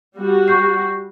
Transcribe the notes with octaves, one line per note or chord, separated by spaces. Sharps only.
G3 F#4
C#6 G6 C7